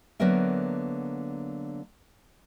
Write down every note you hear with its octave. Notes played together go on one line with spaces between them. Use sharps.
D3 F#3 A#3 B3 A#4 E5